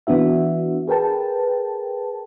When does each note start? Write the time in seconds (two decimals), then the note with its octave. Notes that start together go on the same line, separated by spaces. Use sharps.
0.07 E3 B3 D4 F#4 E5
0.88 G#4 A#4 B4 G5 A5